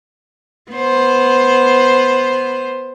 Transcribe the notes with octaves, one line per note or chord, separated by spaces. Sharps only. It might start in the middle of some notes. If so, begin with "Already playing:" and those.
B3 C5